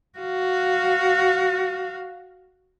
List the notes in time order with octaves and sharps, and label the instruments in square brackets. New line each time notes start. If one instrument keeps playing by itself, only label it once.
[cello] F#4 F5